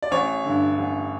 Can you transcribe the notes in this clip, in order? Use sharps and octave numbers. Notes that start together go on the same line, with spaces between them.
D5
A1 C#5
G2 D3
A1